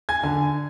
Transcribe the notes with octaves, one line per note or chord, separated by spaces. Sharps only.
G#5 G#6
D3 G#5